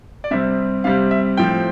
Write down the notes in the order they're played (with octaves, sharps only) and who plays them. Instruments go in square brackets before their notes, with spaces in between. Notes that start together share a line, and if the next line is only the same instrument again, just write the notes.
[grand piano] D5
C3 G3 C4 E5
C3 G3 C4 F5
E5
A2 F3 C4 G5